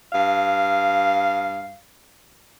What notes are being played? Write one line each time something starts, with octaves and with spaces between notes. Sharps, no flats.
G2 F5